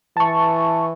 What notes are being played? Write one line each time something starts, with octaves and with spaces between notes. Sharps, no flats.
E3 A5 C#6